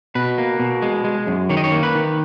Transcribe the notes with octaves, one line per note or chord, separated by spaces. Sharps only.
B2 B4
A#3
B2
G#3
G#3
F#2
D#3 C#5
D#5
C#5
A#3
B4
D#3